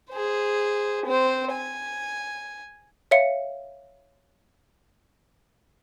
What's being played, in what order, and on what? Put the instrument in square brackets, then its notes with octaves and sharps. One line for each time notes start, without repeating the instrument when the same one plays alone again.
[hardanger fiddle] G#4 C5
C4 C5
G#5
[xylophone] C#5 E5 F5 C#7